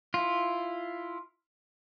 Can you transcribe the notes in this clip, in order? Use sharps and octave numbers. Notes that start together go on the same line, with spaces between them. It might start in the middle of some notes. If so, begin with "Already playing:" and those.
E4 F4